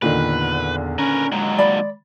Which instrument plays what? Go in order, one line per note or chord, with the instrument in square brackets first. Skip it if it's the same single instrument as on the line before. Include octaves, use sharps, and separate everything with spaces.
[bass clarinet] E2 [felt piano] A#2 D3 D#3 [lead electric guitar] B4
[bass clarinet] C#4 [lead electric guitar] A#4 B4
[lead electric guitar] D#2 F#3 [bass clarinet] G#3
[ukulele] D5 B5